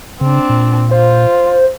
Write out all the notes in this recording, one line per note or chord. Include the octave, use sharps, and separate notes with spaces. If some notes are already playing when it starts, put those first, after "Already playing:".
C#3 C4 D4
A#2
F4 C5